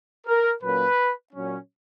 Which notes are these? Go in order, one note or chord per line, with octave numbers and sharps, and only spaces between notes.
A#4
A#2 F#3 A#3 C#4 B4
A#2 F#3 C#4